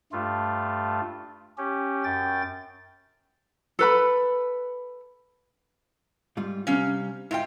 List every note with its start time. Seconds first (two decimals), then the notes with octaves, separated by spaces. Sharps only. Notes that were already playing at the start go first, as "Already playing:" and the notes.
0.12 G2 A3 F4
1.58 C#4 G4
2.04 F#2 G5 A6
3.79 A4 B4 B5
6.37 G#2 G3 F4
6.67 C3 G3 C4 C#4 F5
7.31 G#2 E4 F4 G5